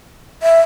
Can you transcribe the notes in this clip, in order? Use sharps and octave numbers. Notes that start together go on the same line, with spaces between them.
E5